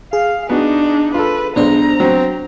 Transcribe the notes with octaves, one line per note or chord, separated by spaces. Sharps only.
G#4 F5
B3 D4 D#4 F#4
F4 A4 B4
B1 G#3 B3 D4 C5 A#5
F#3 C4